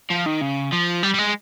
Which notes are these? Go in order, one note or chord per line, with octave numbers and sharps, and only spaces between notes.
F3
D#3
C#3
F3
G3
G3
G#3